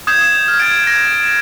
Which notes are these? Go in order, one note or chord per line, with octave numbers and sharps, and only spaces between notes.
D#6 G6 G#6 E7
D#6 E7
F6
G#6 A6 D7
G#6 A#6
E7